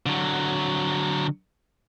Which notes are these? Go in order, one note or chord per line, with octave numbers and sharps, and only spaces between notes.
D3 F#3